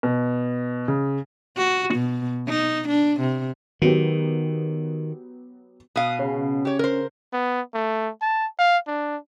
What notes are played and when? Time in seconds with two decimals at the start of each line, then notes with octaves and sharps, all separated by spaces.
0.03 B2
0.88 C#3
1.57 F#4
1.95 B2
2.48 D#4
2.89 D4
3.20 C3
3.82 D#3 F#3 B3 G4
5.96 B2 F5 D#6
6.19 C#3
6.65 G4 C#5
6.79 A#4 C5
7.33 B3
7.74 A3
8.22 A5
8.59 F5
8.87 D4